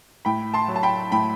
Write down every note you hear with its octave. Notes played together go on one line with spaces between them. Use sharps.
A2 G5 B5
A5 C6
F#3
A5
G5 B5
A2 G5 B5